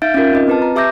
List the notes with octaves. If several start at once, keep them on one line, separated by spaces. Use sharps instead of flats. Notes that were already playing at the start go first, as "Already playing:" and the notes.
D#4 E5 F5 G6 A6 D7
C#4 D#4 F4 A#4
C4 F4 D#5
C4 B4 A5
A#5
G4 E5 D6 E6 G6 A#6